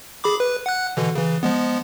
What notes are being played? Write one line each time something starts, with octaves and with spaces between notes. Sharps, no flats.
G#4 B5 D6
B4
F#5 F#6
B2 D3 E3
C#3 E3
F3 G#3 B3